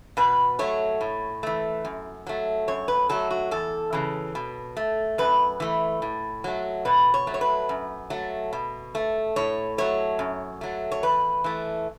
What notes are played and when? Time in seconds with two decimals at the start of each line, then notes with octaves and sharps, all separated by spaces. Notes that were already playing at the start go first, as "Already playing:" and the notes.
0.17 B2 B4
0.59 F#3 A3 C#5
1.01 A2
1.43 E3 A3
1.85 F#2
2.27 F#3 A3
2.68 F#2 C#5
2.88 B4
3.09 F#3 A3 A4
3.30 F#4
3.51 E2 A4
3.93 C#3 E3
4.35 B2
4.77 A3
5.18 F#2 B4
5.60 E3 A3
6.02 A2
6.44 F#3 A3
6.85 B2 B4
7.14 C#5
7.27 F#3 A3
7.34 C#5
7.41 B4
7.69 F#2
8.10 F#3 A3
8.53 B2
8.95 A3
9.36 A2 C#5
9.78 F#3 A3 C#5
10.19 F#2
10.61 F#3 A3
10.92 C#5
11.03 E2 B4
11.44 E3 A3